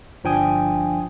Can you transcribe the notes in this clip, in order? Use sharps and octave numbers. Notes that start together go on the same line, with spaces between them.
G1 F3 D4 G5 G#5 D#6